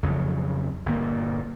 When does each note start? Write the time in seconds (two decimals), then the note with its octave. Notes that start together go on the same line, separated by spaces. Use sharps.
0.03 F2 C#3 F3 F#3
0.86 G1 A#2 A#3